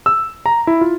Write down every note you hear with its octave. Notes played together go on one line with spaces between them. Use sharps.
E6
A#5
E4
F4